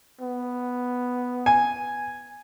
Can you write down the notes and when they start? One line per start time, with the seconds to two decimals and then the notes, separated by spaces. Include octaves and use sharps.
0.21 B3
1.46 G#5